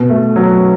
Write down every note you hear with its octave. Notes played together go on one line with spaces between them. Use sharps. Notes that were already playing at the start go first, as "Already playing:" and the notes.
Already playing: B2
A3
F#3